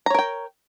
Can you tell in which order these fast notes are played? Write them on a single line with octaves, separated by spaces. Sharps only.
A#5 C#5 A#4 G5